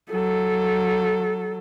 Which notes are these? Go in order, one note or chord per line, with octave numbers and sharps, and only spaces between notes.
F#3 A4